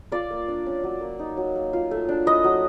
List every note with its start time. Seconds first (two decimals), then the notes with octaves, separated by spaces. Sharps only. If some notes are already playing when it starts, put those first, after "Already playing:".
0.12 F4 D5
0.31 A#3
0.48 D4
0.66 C#4
0.84 F#3
1.01 A#3
1.19 D#4
1.37 F#3
1.56 A#3
1.73 F4
1.91 A3
2.09 D4
2.26 E4 D#5
2.44 F#3